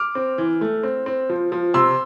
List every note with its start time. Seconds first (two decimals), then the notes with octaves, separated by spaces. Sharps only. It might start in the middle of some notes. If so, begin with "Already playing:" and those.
Already playing: D6 F6
0.15 C4
0.38 E3
0.61 A3
0.83 C4
1.06 C4
1.29 F3
1.52 F3
1.74 C3 C6 E6